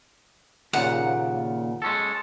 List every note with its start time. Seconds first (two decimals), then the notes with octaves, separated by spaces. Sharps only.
0.73 D#2 A#2 C#3 F#5
1.82 G#3 C#4 A4